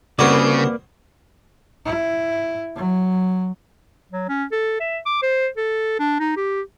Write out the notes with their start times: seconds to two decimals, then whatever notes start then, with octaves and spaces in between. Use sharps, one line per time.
0.19 C2 C#3 A#3 F#4 B4 D5
1.86 E4
2.76 F#3
4.12 F#3
4.29 C#4
4.52 A4
4.80 E5
5.06 D6
5.22 C5
5.57 A4
5.99 D4
6.20 D#4
6.37 G4